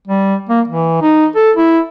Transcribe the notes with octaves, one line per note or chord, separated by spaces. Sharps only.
G3
A#3
E3
D#4
A4
E4